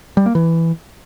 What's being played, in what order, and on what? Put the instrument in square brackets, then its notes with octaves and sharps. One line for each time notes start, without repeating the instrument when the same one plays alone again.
[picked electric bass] G3
A#3
E3